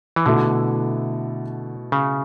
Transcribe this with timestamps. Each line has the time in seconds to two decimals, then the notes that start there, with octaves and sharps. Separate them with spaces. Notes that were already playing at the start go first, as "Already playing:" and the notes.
0.16 E3
0.25 B2 D3 A3 E4
1.92 C#3